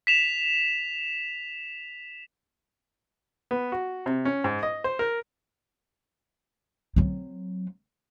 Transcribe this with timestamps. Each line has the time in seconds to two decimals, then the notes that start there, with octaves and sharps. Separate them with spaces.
0.07 B6 E7 F7
3.51 B3
3.72 F#4
4.06 C3
4.25 C#4
4.44 G#2
4.63 D#5
4.84 C5
4.99 A#4
6.96 F#3 C4